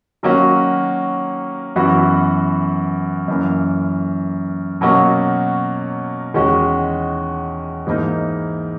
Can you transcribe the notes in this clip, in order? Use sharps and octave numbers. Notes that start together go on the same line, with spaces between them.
D#3 F#3 A#3 C#4 F#4
F#2 E3 B3 F#4 B4
F#2 E3 A#3
B2 F#3 A#3 C#4 F#4
E2 D#3 G#3 C#4 F#4
G#2 E3 A#3 D#4